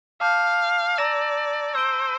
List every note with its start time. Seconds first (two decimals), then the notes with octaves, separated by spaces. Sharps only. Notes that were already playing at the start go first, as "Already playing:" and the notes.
0.21 F5 A5 D6 G6
0.98 D5 A#5 E6 A#6 E7
1.75 C5 E6 G6 D7 G7